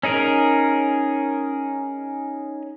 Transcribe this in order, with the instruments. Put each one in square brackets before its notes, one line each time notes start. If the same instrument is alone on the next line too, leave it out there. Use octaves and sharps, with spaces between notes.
[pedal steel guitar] C#4 D#4 G#4 A#4